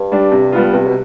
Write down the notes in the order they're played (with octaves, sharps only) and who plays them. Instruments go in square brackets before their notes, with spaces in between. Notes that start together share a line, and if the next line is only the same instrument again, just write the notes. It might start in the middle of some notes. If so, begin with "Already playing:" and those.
Already playing: [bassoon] G2
[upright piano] G3 D4
C3
G3 B3 F4
[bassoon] G2 [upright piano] C3
[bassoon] B2